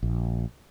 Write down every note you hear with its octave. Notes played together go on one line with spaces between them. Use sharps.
A#1